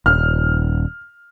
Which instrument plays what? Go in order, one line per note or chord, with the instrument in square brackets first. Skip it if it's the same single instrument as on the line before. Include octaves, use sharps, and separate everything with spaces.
[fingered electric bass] D#1 [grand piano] F6